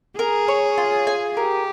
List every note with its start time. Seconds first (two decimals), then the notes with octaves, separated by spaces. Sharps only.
0.19 G#4 A#4
0.48 C#5
0.78 F4
1.07 G#5
1.37 G4 A#4